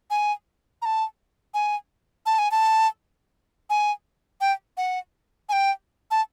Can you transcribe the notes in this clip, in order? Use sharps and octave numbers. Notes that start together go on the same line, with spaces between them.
G#5
A#5
A5
G#5
A5
G#5
A5
G#5
G5
F#5
G#5
G5
A5